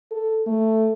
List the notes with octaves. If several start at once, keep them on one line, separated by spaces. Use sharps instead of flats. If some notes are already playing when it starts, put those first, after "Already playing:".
A4
A3